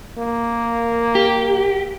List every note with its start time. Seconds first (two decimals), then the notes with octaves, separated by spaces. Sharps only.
0.17 A#3
1.15 G4